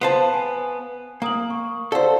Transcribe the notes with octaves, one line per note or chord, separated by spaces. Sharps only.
B3 C5 F5 A5
G#5
A#3 A#5 D#6 F#7
C#6
A4 C5 D5 F5 F#5